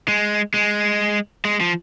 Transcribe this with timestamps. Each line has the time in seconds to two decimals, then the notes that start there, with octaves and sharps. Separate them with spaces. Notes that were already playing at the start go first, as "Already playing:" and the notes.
0.08 G#3
0.54 G#3
1.45 G#3
1.61 F3